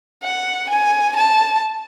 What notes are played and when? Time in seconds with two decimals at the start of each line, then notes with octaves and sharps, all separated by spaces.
0.23 F#5
0.70 G#5
1.16 A5